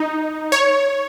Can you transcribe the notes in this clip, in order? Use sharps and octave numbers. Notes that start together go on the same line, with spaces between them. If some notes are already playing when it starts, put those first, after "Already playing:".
Already playing: D#4
C#5